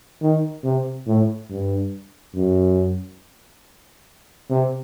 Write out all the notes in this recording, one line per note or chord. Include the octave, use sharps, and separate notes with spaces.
D#3
C3
A2
G2
F#2
C3